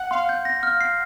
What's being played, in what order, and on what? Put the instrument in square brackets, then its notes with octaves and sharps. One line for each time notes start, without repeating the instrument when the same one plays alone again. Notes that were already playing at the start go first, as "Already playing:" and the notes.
Already playing: [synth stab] F#5
[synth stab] F5 [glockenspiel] C6
[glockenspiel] G6
A#6
F6
C7